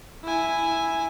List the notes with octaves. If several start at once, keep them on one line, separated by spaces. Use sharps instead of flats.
E4 G#5